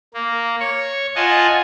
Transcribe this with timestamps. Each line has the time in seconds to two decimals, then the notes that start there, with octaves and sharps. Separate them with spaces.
0.14 A#3
0.60 C#5 C#6
1.16 F4 D#5 F#5 G#5 A5